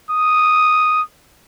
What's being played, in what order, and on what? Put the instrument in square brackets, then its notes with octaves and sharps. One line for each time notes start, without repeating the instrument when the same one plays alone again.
[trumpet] D#6